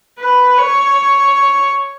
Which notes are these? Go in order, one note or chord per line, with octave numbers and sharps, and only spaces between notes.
B4
C#5